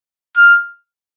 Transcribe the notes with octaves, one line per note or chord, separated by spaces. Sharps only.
F6